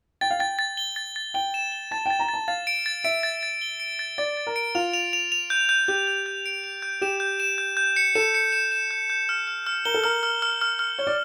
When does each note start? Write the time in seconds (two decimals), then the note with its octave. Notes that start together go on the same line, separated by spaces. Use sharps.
0.21 G5 A6
0.31 F5
0.39 G5 A6
0.59 A6
0.77 G7
0.96 A6
1.16 A6
1.34 G5 G7
1.54 E7
1.72 G7
1.91 A5 A6
2.06 G5 A6
2.19 A#5
2.29 A6
2.34 A5
2.48 F5 A6
2.67 D7
2.86 A6
3.04 E5 D7
3.23 A6
3.43 A6
3.62 G7
3.80 D7
3.99 A6
4.18 D5 A6
4.37 A6
4.47 A#4
4.56 D7
4.75 F4 F7
4.93 F7
5.13 F7
5.32 F7
5.50 G6
5.69 G6
5.88 G4 G6
6.08 G6
6.26 G6
6.46 D7
6.64 F7
6.82 G6
7.01 G4 E7
7.20 G6
7.40 E7
7.58 G6
7.77 G6
7.96 C#7
8.15 A4 E7
8.34 C#7
8.52 E7
8.72 E7
8.91 G6
9.10 G6
9.29 F6
9.47 F6
9.67 F6
9.85 A#4 G7
9.94 A4
10.04 A#4 F6
10.23 F6
10.42 F6
10.61 F6
10.79 F6
10.99 C#5 G7
11.07 D5